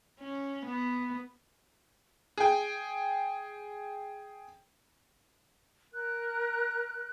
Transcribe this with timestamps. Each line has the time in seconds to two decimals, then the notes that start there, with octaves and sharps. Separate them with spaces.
0.20 C#4
0.65 B3
2.38 G#4 G5
5.93 A#4 F#6